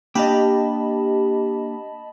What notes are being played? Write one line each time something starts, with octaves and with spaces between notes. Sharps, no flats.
A#3 D4 G4 D#5 F5 A5 B5